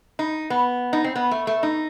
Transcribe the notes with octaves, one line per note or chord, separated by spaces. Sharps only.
D#4
B3
D#4
C4
B3
A3
A3
D#4